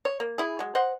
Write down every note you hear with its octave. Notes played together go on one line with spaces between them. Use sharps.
C#5
A#3
E4 G#4
F#3 G#3
C5 D#5 F#5